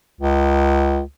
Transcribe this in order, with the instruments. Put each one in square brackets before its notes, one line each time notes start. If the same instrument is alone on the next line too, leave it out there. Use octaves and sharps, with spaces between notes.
[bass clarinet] C#2